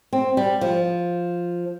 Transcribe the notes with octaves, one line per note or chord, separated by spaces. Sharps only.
C4
G3
F3